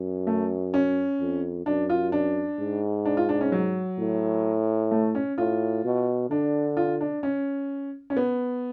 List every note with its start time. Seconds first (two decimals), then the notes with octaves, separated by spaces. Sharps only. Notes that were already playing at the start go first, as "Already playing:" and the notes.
Already playing: F#2
0.27 A3
0.74 C#4
1.21 F2
1.66 F#2 D4
1.90 F4
2.12 D4
2.59 G#2
3.05 D4
3.17 F4
3.29 D4
3.41 C#4
3.52 F#3
3.99 A2
4.91 A3
5.15 C#4
5.38 A2 F4
5.84 B2
6.30 D3 D4
6.77 F4
7.01 D4
7.23 C#4
8.10 C#4
8.17 B3